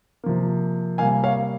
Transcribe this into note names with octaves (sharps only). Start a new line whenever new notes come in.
C3 F3 A#3
C3 G3 A#3 F5 G#5
C#5 F5